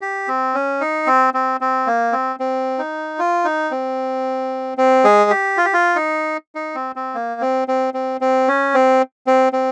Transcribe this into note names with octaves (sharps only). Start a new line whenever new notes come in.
G4
C4
C#4
D#4
C4
C4
C4
A#3
C4
C4
D#4
F4
D#4
C4
C4
G#3 G#4
G4
F4
G4
F4
D#4
D#4
C4
C4
A#3
C4
C4
C4
C4
C#4
C4
C4
C4